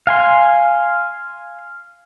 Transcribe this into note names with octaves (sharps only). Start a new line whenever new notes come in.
F5 G#5 C6